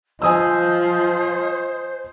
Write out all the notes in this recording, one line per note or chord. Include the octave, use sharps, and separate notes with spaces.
F3 C5 D#5 G#5 D#6 E6